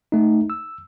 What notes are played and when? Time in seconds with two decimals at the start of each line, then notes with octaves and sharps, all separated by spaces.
0.12 A3 D#4
0.50 E6